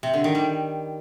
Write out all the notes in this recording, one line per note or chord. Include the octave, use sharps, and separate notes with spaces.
C3
D3
D#3
G3